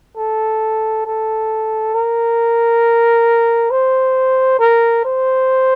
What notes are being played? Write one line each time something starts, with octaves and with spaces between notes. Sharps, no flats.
A4
A4
A#4
C5
A#4
C5